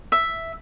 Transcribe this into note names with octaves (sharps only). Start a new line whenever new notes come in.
E5